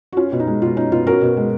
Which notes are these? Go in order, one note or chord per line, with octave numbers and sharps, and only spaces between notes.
F#4
C#4 F4
B2
D#4
G#3
B2 F4
C#4 D#4
B2 F4
C#4 F#4 A#4
B2
G#3